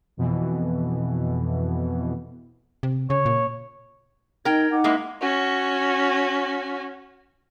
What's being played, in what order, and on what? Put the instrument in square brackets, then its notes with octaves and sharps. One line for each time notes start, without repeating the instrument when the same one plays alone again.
[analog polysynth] F2 B2 E3
[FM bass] C3
[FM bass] C#3 [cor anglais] C#5
[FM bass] A#2
[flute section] D#4 G#6 [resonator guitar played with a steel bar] A#4 G5
[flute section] D#4 F#5 D6
[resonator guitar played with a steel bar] G#3 A#3 E4
[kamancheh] C#4 F#4